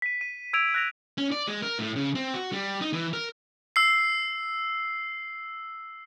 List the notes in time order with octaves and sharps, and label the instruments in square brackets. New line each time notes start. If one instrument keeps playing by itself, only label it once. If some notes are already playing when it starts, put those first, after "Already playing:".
[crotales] B6 D#7
D#7
E6 G#6 D7 D#7 F7
F#6 A#6 F7
[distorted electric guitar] C#4
D5
G#3
A#4
A2
C#3
C4
F#4
G3
D#4
E3
A#4
[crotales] E6 C7